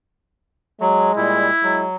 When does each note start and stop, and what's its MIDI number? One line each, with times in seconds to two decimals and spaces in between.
0.81 1.12 54
0.81 1.53 56
1.17 1.51 46
1.17 1.51 55
1.17 1.84 64
1.63 1.96 54
1.63 1.88 56